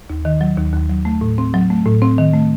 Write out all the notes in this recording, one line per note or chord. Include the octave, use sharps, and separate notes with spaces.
D#2
D#3
F#3
D#2
D#2
F#3
A3
A2
C4
F#3
A3
A2
C4
D#3
A3